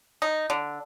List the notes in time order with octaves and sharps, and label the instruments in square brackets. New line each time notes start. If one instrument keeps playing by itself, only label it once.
[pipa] D#4
D3